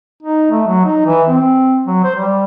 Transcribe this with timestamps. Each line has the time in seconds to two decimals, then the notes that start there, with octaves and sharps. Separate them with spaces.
0.23 D#4
0.51 A3
0.67 F#3
0.85 D#4
1.06 E3
1.28 C4
1.87 F#3
2.04 C5
2.16 G3